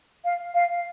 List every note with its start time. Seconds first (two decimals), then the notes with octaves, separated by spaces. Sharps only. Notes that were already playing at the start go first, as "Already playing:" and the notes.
0.24 F5
0.54 F5